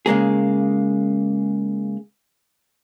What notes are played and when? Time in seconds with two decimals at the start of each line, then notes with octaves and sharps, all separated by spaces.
0.06 C#3 G#3 A#3 G#4